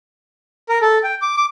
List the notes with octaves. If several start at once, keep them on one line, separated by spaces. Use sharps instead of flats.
A#4
A4
G5
D6
D6